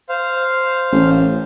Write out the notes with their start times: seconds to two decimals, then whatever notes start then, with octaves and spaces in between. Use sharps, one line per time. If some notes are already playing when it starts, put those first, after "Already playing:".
0.09 C5 F5
0.92 A1